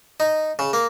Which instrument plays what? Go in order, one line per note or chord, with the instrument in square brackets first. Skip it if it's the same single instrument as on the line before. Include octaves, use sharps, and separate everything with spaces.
[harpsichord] D#4
C#3
A#3